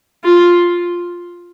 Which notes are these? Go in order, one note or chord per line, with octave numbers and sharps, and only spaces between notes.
F4